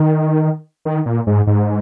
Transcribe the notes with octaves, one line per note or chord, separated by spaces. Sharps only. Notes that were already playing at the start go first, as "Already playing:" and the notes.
Already playing: D#3
D#3
A#2
G#2
G#2